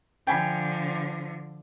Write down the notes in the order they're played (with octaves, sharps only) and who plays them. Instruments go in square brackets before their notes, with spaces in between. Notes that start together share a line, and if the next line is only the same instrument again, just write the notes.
[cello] D3 F3 [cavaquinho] G5 G#5 B5